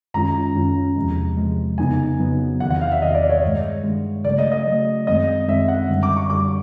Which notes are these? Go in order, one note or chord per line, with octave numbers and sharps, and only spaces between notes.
F#2 D#3 G#3 C#4 F4 A#5
F#2 D#3 G#3 C#4 F4
E2 C3 F3 G#3
E2 C3 F3 G#3
F2 C#3 F#3 B3 D#4 G#5
F2 C#3 F#3 B3 D#4
E2 C3 D#3 F#5
F#5
F5
E5
E2 C3 D#3 D#5
D5
C#5
G2 D#3 G#3
G2 D#3 G#3
C#3 F#3 A3 D5
D#5
D#5
C#3 F#3 A3
F#2 D#3 G#3 C4 D#5
F#2 D#3 G#3 C4 E5
F#5
F#2 D3 G3
D6
C#6
F#2 D3 G3 D6